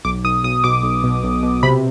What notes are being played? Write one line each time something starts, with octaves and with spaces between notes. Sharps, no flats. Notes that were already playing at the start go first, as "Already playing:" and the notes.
B1 D6
B1 D#6
B1 D#6
B2 D6
B1
B2
B1
B2
C3 B5